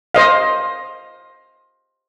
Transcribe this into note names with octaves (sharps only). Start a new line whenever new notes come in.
C5 D#5 F5